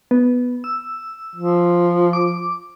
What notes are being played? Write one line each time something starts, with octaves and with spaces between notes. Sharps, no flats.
B3
E6
F3
D6